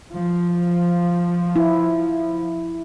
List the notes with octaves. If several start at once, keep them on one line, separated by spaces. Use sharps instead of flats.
F3
E4